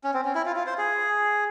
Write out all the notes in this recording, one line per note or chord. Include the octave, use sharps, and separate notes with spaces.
C#4
C4
C#4
E4
F4
F4
C5
G#4